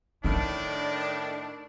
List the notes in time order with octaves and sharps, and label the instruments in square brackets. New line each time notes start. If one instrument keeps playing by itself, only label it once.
[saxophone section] A2 D#3 [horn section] D4 [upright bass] E4